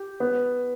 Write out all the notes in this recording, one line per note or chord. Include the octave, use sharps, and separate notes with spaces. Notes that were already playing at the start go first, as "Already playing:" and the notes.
Already playing: G4
B3